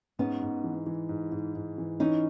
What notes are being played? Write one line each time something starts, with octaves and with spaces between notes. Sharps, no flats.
G#2 B3 C#4
G#2
E3
E3
G#2
G#2
G#2
E3
E3 C#4 D#4